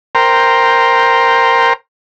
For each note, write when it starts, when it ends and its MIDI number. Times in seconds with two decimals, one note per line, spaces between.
0.15 1.73 70
0.15 1.73 72
0.15 1.73 79
0.15 1.73 82
0.15 1.73 84